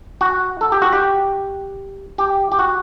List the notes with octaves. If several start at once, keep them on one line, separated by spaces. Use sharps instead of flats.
F#4
A4
G4
F#4
G4
G4
G4
F#4